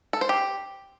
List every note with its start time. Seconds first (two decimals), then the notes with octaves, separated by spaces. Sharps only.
0.13 A4
0.21 C5
0.29 G4